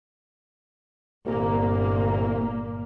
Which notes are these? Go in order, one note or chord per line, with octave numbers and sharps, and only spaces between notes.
G1 C2 A#2 A#3